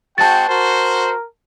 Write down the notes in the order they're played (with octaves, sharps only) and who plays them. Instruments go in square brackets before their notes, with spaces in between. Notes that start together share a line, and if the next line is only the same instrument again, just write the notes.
[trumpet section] G#3 C4 F#4 [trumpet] G5 [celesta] A5 A6
[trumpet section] F#4 C5 [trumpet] A#4